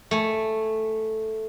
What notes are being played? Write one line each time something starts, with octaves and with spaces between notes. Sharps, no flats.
A3 G#5